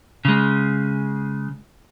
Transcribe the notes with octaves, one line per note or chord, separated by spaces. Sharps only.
C#3 G#3